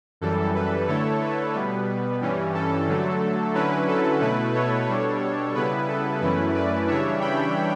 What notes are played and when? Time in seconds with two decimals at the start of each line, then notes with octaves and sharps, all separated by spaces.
0.21 F#2 E3 G3 A4
0.55 B4
0.88 D3 A3 E4 A4 C#5
1.21 B4
1.54 B2 G3 B3
2.21 G2 E3 G3 C#4
2.54 A4
2.87 D3 F#3 A3
3.54 D3 F#3 C#4 E4 B4
3.88 A4
4.21 B2 A3 E4 B4
4.54 A4 C#5
4.88 B2 G3 D4
5.54 C#3 G3 B3 E4 B4
5.88 A4
6.21 F#2 E3 A3 C#4 E4 B4
6.55 B4 D5
6.87 C#3 E3 G3 D4 C#5 E5
7.21 G5 B5